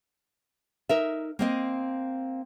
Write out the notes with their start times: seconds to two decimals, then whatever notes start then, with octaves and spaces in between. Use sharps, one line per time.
0.89 D#4 A#4 E5
1.39 A#3 C4 D#5